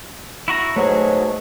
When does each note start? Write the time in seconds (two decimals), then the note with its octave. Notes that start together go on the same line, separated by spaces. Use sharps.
0.48 E4 F#4 A#5
0.76 G#2 B2 F#3 A3 G#4